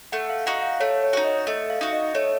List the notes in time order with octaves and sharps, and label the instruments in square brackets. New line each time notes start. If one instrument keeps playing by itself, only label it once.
[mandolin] A3 [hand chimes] F#5
[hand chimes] F5
[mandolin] D#4 F#4 [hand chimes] F#5
[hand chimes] F5
[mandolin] A3 [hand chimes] C#5
[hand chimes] C#5
[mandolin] D#4 F#4
[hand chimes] D#5
[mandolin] A3 [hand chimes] D#5
[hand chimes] F5
[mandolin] D#4 F#4
[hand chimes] D#5
[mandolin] A3 [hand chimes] C#5